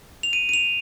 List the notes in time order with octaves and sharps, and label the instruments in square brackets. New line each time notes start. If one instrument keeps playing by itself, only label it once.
[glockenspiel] F7
D#7
D#7
F7